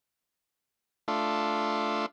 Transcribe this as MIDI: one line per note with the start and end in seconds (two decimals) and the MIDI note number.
1.08 2.06 57
1.08 2.06 62
1.08 2.06 65